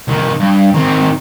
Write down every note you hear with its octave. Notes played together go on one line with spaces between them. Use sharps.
C2 D#3
G2
D#3 C4